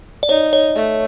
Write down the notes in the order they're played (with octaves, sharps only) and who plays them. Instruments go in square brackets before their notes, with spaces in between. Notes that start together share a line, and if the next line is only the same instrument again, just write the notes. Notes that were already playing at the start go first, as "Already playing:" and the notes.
[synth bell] D5
[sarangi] D#4 [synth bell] C#5
[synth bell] C#5
[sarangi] A3